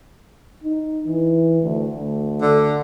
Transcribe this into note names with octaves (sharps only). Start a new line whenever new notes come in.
D#4
E3
D2
D2
D3